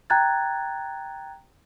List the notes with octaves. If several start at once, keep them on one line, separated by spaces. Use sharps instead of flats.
G5 A#5 F#6 G#6 A6